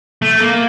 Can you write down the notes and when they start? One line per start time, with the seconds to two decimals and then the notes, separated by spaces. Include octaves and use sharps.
0.22 A3
0.41 A#3